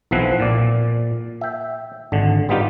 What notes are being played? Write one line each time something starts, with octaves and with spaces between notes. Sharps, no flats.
B1 E3 F3 C4 E4 F#5
A#2 D5
E5 G5
G#1 D3
G3 B3 D#4 F4 G4